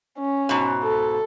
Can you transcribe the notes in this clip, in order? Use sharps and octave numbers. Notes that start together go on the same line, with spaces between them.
C#4
G#2 B2
A4